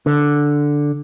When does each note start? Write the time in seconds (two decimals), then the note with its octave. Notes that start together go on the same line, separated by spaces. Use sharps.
0.06 D3